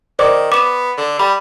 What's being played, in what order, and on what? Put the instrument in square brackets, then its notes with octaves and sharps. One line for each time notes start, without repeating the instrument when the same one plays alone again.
[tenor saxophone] D#3 [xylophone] C5 D5 D6
[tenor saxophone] B3 [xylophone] D6 E7
[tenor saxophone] D3
[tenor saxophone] G3 [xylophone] B5